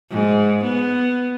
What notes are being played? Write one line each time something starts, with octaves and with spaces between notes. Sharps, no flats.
G#2
B3